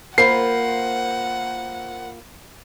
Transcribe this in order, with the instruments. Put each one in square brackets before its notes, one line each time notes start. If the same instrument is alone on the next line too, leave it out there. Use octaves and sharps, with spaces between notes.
[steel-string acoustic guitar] A#3 F4 [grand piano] A#4 C5 B5 [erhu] F#5 [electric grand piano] C7